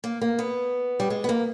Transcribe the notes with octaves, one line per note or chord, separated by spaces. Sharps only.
A#3
A#3
B3
G3
G#3
B3
A#3